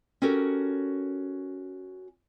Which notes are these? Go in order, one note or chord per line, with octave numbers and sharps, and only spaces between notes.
C#4 F#4 G4 A4 A#4